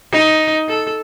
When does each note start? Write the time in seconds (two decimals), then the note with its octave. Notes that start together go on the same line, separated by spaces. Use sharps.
0.11 D#4
0.68 A4